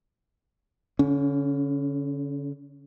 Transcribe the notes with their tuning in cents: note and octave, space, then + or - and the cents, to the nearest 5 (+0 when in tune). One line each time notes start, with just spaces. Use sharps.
D3 -40 C#4 +10